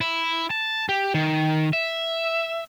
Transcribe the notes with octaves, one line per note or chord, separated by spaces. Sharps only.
E4
A5
G4
D#3
E5